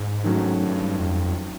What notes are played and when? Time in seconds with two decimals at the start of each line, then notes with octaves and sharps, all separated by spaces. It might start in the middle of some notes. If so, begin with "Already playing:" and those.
Already playing: G#2
0.24 D#3 F#3 A3 C#4 F#4
0.62 G2
0.99 F2